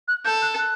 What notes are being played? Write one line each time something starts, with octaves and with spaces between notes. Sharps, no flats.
F#6
A4 G6
F#6
F#6